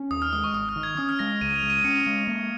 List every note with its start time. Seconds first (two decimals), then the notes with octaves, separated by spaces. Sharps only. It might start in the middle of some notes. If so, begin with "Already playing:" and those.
Already playing: C#4
0.11 D#2 D#6
0.22 F6
0.33 G#3 D#6
0.44 C#6
0.54 G#1 D#6
0.69 F6
0.76 D#3
0.83 G#6
0.97 C#4 D#6
1.09 F6
1.19 G#3 A#6
1.41 C#2 D#7
1.56 F7
1.63 G#3
1.70 D#7
1.84 C#4 C#7
2.06 G#3
2.27 A#3